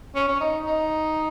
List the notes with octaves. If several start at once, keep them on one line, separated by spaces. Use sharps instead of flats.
C#4
C#4
D#4
D#4